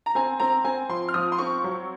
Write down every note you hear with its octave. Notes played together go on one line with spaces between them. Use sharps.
A#5
C4 G#5
C4 A#5
C4 G#5
F3 C6
F6
F3 D#6
C6
C4 C#6
F#3